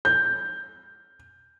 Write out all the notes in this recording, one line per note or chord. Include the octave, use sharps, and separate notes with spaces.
G6